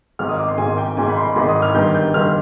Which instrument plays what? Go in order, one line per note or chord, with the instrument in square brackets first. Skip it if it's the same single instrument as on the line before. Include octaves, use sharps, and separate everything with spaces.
[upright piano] G#1 G#2 D#3 F6
D#6
D6
C6
G#1 G#2 D#3 G#5
G5
G#1 G#2 D#3 G#5
B5
C6
G#1 G#2 D#3 B5
D#6
F6
G1 G2 D#3 G6
G6
G1 G2 D#3 F6